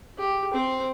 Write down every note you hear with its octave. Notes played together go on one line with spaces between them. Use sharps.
G4
C4 C5